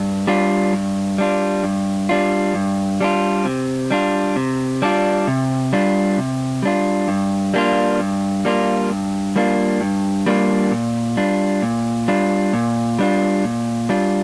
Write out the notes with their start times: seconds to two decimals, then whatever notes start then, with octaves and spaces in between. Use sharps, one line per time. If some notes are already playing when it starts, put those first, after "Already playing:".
Already playing: G2
0.27 G3 D4 F4
0.73 G2
1.18 G3 D4 F4
1.64 G2
2.09 G3 D4 F4
2.54 G2
3.00 G3 D4 F4
3.45 C3
3.91 G3 D4 F4
4.36 C3
4.82 G3 D4 F4
5.27 C3
5.73 G3 D4 F4
6.18 C3
6.62 G3 D4 F4
7.08 G2
7.54 G3 A#3 D4 F4
7.99 G2
8.45 G3 A#3 D4 F4
8.90 G2
9.36 G3 A#3 D4 F4
9.81 G2
10.26 G3 A#3 D4 F4
10.71 A#2
11.17 G3 D4 F4
11.62 A#2
12.08 G3 D4 F4
12.53 A#2
12.99 G3 D4 F4
13.44 A#2
13.89 G3 D4 F4